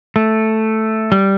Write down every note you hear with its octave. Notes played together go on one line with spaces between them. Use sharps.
A3
G3